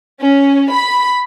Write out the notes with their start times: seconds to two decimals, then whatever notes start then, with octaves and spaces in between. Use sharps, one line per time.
0.23 C#4
0.72 B5